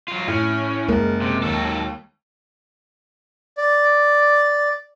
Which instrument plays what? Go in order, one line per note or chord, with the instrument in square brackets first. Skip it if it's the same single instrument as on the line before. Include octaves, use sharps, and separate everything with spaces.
[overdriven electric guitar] F#3 F4
[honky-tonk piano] A2 [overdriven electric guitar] C#4
[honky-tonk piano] F#1 [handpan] G#3 A#3 A#4
[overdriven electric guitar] C3
[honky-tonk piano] D#2 [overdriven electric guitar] F#3 A4
[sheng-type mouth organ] D5